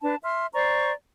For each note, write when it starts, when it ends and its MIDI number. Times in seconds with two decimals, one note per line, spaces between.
0.02 0.15 62
0.02 0.15 71
0.02 0.15 81
0.23 0.46 76
0.23 0.46 84
0.23 0.46 89
0.54 0.92 72
0.54 0.92 74
0.54 0.92 82
0.54 0.92 85